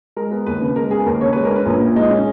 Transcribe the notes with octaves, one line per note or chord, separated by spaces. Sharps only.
G#3 A#4
B3
D#2 B4
C#3
G#3 A#4
B3 G#4
D#2 A#4
C#3 C#5
G#3 B4
A#4
C#4
B4
A#1
A#2
G#3 D#4
C#4